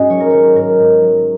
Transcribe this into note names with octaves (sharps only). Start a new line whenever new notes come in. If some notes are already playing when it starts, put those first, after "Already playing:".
Already playing: G#2 C#4 F#4 G#4 D#5 G#5
F#3 C#5
A#4
D#3 C#5
G#2 A#4
G#2
F#3